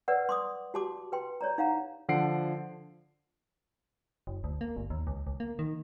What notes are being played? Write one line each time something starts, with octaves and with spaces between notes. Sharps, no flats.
B4 C#5 D5 F#5 E6
C6 D6 D#6
F#4 G4 A5 C6 D6
B4 G5 C6
C#5 D5 A#5
D#4 F5 F#5 A#5
D3 F3 F#5 C7 D7
F#1
D2
A#3
G1
D#2
C#2
C#2
A#3
D#3